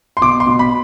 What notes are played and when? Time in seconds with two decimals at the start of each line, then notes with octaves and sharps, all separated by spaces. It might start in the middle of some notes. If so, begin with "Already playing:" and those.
0.17 C6
0.21 B2 D6
0.40 C6
0.47 B2
0.59 B5